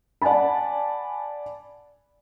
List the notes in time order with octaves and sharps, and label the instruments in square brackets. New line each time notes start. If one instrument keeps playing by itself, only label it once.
[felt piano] D5 F#5 G#5 A5 B5